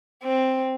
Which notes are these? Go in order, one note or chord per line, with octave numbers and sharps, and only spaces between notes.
C4